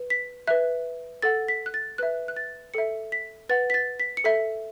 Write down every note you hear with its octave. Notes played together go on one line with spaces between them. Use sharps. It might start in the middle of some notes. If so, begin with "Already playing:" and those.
Already playing: B4
B6
B4 E5 F#6
A4 F#5 A6
B6
F#6
A6
B4 E5 F#6
F#6
A6
A4 E5 C#7
B6
B4 F#5 A6
B6
A6
B6
C#7
A4 E5 B6